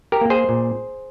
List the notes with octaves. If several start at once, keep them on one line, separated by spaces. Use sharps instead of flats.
G4 A#4
A#3
G#4 C5
A#2